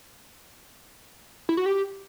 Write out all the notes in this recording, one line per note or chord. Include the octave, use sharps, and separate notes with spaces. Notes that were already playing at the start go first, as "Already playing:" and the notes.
E4
F#4
G4